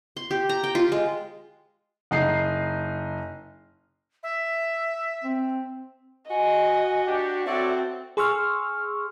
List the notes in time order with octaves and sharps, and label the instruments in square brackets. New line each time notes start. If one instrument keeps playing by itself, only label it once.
[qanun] C6
G4
A#5
G5
F4
G#3
[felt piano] F#1 D#4 C7
[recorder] E5
[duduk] C4
[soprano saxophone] F#4 [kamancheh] D#5 [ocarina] G#5
[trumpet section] D4 G4
[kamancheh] C4 [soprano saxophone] F#4 [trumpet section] A4 C#5 D5 [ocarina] E5
[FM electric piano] G#4 C6 C#6 E6 F6